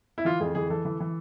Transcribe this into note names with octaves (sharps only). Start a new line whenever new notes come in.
E4
E3 F4
F2 G#4
E3 G#4
E3 A4
E3
E3